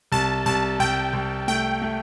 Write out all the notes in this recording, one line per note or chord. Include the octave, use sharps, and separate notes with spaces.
C2 A5
C2 A5
C2 G5
C2
A3 G5
A3